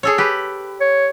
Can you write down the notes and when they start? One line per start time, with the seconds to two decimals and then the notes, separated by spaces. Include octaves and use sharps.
0.03 G#4 A4 C#5
0.18 G4 B4
0.81 C#5